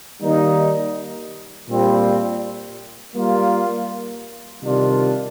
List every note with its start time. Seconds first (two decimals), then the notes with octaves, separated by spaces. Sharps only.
0.21 D#3 G3 A#3 D#4
1.68 A#2 G3 C4
3.14 G3 A#3 F4
4.62 C3 D#3 G3 D4 F4